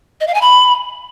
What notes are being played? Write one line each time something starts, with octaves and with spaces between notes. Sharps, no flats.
D#5
F5
G#5
B5